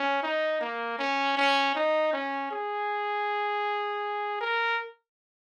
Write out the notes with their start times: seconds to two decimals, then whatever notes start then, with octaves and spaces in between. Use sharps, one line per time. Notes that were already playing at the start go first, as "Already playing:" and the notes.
Already playing: C#4
0.23 D#4
0.61 A#3
0.99 C#4
1.37 C#4
1.75 D#4
2.13 C#4
2.51 G#4
4.41 A#4